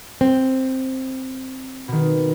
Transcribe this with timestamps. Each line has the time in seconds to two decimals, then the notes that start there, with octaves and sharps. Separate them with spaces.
0.21 C4
1.88 B2 D#3